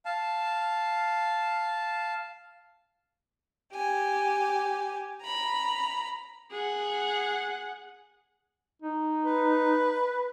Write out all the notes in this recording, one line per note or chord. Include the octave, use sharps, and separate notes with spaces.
F5 A5
G4 G#5
A#5 B5
G#4 F#5
D#4
B4